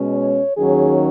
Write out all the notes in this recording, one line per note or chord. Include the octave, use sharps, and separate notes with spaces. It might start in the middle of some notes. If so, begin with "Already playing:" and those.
Already playing: B2 G#3 C#4
C#5
D#2 D#3 F#3 C#4 G#4